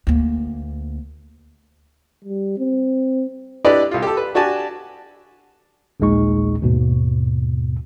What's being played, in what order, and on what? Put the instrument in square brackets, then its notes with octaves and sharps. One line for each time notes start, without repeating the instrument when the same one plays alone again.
[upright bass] D2 A#3
[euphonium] G3
C4
[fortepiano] D4 E4 G4 B4 D5 D#5
C2 F4
G4 A4
B4
D4 F#4 G4 G#5 A5
[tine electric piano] A#1 D#2 A#2 G#3 D#4 C#6
D#2 G#2 B2